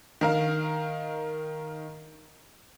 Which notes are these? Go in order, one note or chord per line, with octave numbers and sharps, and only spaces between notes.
D#3 A#4 F5